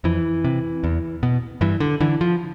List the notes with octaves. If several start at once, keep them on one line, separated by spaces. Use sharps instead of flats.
F2 E3
C3
E2
B2
G2 E3
D3
D3 E3
F3